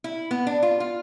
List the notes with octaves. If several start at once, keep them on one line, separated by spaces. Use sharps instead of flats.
E4
B3
D4
F4
F4